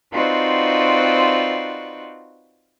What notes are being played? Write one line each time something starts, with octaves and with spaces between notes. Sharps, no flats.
C4 D#4 F4 F#4 B4 D5